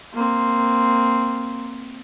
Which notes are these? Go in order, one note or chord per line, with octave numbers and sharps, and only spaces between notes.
A#3 C4